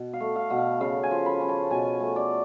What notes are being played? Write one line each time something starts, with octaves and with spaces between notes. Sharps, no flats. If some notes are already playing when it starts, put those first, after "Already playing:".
Already playing: B2
F5
A3
F5
B2 F#5
F5
C#3 F5
G#5
F3
B5
C#4
A5
B2 G#5
A3
D5